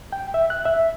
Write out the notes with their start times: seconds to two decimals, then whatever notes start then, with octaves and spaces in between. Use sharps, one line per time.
0.12 G5
0.34 E5
0.50 F#6
0.66 E5